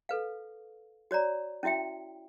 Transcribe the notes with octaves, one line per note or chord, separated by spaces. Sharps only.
A4 B4 F5
F#4 C#5 D5 A#5
C#4 E4 F#4 E5 G5